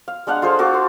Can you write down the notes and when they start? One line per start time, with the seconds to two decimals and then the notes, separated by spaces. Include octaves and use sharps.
0.08 F5
0.27 G#3 D4 F5 F#5
0.42 F4 G#4 A4 C5
0.59 F#4 A4 F5 D6
0.74 C6